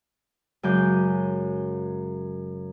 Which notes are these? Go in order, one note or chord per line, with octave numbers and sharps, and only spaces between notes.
F#2 C#3 G#3 D6 G6